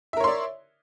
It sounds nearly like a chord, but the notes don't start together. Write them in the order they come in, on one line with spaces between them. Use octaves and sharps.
E5 A#4 C#5 C6 D5